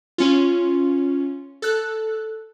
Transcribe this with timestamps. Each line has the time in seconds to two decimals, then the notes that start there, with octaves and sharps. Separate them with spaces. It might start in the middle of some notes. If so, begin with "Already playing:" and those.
0.18 C#4 F4
1.62 A4 F#6